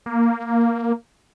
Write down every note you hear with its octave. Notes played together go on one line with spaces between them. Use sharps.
A#3